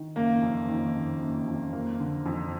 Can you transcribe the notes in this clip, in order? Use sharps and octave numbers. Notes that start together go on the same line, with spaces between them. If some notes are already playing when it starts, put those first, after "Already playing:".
Already playing: D#3
F#1 A#3
F2
D#3
F#1
F#1
F2
A#3
D3
F2